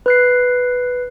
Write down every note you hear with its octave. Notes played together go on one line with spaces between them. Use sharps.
B4 F#6 C7